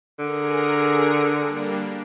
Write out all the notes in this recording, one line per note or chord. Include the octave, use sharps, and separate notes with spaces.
D3 G#4 A#4
G3 A#3 D4